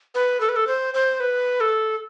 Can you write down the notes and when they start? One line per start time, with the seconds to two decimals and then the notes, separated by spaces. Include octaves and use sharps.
0.15 B4
0.40 A4
0.49 B4
0.56 A4
0.67 C5
0.94 C5
1.20 B4
1.60 A4